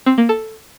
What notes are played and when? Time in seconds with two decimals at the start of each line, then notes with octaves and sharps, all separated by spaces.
0.06 C4
0.18 A#3
0.29 A4